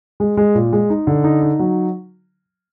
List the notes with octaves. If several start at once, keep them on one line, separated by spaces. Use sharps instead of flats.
G#3
G#3
A#2
G#3
D#4
D3
D#4
D#4
F#3